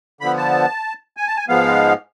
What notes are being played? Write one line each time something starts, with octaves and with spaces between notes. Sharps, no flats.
D3 F3 B3 B5
A5
G#5
A5
G#5
G#2 F3 G#3 B3 F5